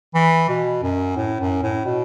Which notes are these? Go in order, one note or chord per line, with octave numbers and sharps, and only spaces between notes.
E3
B2
F#2
A2
F#2
A2
B2